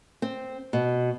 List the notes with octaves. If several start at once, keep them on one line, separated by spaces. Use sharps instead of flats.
C4
B2